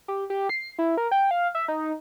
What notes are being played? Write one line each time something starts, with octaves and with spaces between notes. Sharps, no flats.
G4
G4
C7
E4
A#4
G5
F5
E5
D#4